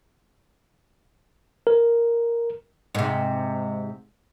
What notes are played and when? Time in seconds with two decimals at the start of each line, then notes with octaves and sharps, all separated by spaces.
1.67 A#4
2.95 G#2 C3